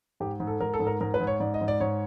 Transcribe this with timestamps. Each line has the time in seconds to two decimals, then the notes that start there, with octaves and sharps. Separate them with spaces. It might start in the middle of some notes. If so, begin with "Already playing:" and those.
0.20 G#2 G4
0.40 G#2
0.47 A4
0.61 G#2 A#4
0.74 A4
0.80 G#2
0.87 A#4
1.01 G#2 A#4
1.14 B4
1.20 G#2
1.27 C#5
1.40 G#2 D5
1.54 D#5
1.61 G#2
1.68 D5
1.80 G#2 C#5